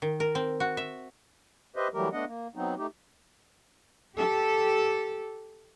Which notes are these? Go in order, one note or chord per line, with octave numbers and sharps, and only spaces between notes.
D#3
A#4
C4
F#4
E5
G4 B4 C5 D#5 E5
E3 F#3 G3 A3 G4 A#4
A3 B3 D4 D#5 F#5
A#3
F#3 B3 C4 D#4
A3 D#4 G4
G4 A4